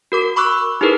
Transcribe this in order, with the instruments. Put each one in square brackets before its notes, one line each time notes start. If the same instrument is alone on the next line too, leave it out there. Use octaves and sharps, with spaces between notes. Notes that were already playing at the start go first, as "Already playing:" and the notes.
[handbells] F#4 A#4 D6
B5 C#6 D6 E6 F#6
D#4 E4 G4 G#4 A#4 B4